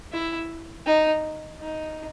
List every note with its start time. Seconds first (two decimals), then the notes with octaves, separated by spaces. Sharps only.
0.13 E4
0.86 D#4
1.59 D#4